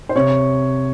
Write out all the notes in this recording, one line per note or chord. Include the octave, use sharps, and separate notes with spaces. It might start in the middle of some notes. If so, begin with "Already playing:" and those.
C5
C3 C#5